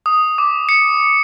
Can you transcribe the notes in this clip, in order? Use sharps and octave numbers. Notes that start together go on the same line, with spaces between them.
D#6
D6
C#7